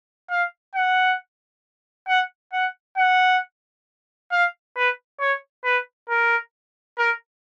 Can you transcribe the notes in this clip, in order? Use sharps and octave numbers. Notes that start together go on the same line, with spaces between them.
F5
F#5
F#5
F#5
F#5
F5
B4
C#5
B4
A#4
A#4